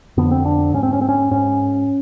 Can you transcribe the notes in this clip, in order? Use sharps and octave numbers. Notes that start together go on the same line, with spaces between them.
F2 D3 B3
C4
D4
G#2 C#4
C4
C#4
C4
C#4
G#2 C#4